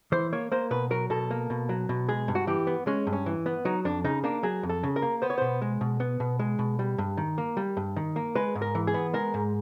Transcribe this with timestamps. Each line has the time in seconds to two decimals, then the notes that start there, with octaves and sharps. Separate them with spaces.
0.12 E3 C5
0.33 A#3 C#5
0.52 A#3 C5
0.71 B2 B4
0.91 F#3 A#4
1.10 B2 A4
1.31 A#3
1.50 B2
1.69 F#3
1.89 B2
2.08 G#3 G#4
2.28 G2
2.35 F#4
2.47 E3 G4
2.67 B3
2.87 G#3 C#4
3.07 G2
3.13 C#4
3.26 E3
3.46 B3
3.65 F#3 D#4
3.85 F2 D4
4.04 C#3 D#4
4.24 A#3 D4
4.43 F#3 G#4
4.63 F2
4.69 A4
4.83 C#3
4.96 A#4
5.02 A#3
5.22 B3 C5
5.30 C#5
5.38 B2 C5
5.62 G#3
5.81 B2
6.00 B3
6.20 B2
6.39 G#3
6.59 B2
6.79 G3
6.98 G2
7.17 D#3
7.38 A#3
7.57 G3
7.77 G2
7.96 D#3
8.16 A#3
8.35 G#3 B4
8.55 G#2
8.62 A#4
8.75 E3
8.87 G#4
8.94 B3
9.14 G#3 A#4
9.34 G#2